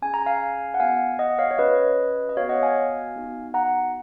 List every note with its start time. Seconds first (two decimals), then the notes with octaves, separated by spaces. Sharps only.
0.02 C#4 G#4 G#5
0.14 A#5
0.26 F5 G#5
0.74 F#5
0.80 B3 F#4 F5 G#5
1.19 D#5 F#5
1.39 C#5 F5
1.51 C#5
1.58 C#4 F#4 B4 D#5
2.29 D#5
2.37 B3 F#4 C#5 F5
2.49 D#5 F#5
2.63 F5 G#5
3.15 B3 D#4 F#4
3.54 F#5 A#5